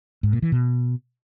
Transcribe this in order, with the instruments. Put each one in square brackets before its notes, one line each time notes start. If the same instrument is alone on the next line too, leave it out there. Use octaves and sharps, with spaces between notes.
[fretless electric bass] G#2
A#2
E3
B2